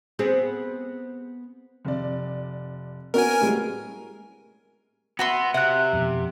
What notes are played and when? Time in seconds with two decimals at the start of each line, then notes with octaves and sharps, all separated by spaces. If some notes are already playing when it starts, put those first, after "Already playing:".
0.19 B3 C4 G#4
1.85 F1 D5
3.14 B3 C#4 F#4 A#4 G#5
3.41 A2 G3 G#3
5.19 B3 F#4 E5 C6
5.54 C3 E5 F#5 F#6
5.93 F2 B2